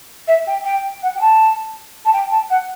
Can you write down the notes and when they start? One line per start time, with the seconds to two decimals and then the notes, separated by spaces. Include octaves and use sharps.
0.28 E5
0.47 G5
0.65 G5
1.03 F#5
1.15 G5
1.21 A5
2.05 A5
2.13 G5
2.32 A5
2.50 F#5